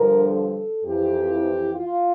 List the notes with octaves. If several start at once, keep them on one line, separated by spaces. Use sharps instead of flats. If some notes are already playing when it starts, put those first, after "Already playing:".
Already playing: G2 D3 F3 A#4
A4
F2 E3 G4
F4